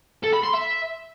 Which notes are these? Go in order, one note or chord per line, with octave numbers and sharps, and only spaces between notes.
A4
B5
C6
E5